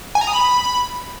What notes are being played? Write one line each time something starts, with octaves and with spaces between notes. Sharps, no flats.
G#5
A#5
D#6
B5